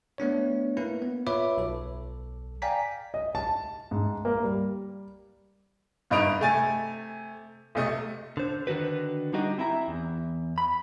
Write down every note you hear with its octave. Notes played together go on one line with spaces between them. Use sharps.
A3 B3 D4 C#5
A#3 E4 B4
B3
F4 B4 C#5 E5 B5 D6
B1 A4
D5 F5 G5 G#5 A#5 B6
D#5
A5
G#2
A#3
G3
F#1 G2 D#4 D#5 D7 F7
C3 A3 G#5 A6
B1 C3 A3 D#5
D3 C5
D3 D#3 F#4 B4
G3 D4 D#4 F#4 G4 D#5
C4 E4 E5 A#5
E2
B5